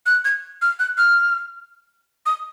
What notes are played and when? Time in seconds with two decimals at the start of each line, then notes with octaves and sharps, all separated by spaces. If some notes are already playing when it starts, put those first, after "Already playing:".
0.06 F#6
0.25 G#6
0.62 F6
0.79 F#6
0.98 F6
2.26 D#6